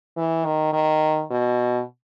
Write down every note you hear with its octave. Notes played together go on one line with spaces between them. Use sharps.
E3
D#3
D#3
B2